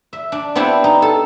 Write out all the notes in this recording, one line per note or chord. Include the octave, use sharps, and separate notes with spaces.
E5
D4
B3 C4 D4 E4 G4
D#4
A4 A5